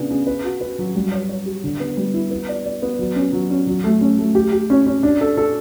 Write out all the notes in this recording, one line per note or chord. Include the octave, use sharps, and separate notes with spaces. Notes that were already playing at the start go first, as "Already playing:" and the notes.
Already playing: C#3 B3 D4
C#3
B4
F#4
B4
F#3
G3
C#5
C#5
G4
D3
B3
G3
E4
B3
D5
D5
B3
F#3
C#4
F#3
C#4
F#3
A3
C#4
A3
G4
G4
C#4
C#4
D4
A4
A4